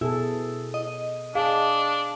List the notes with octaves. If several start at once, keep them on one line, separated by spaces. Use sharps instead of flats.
B2 E4 G#4 A4
D#5
D4 G#4 F5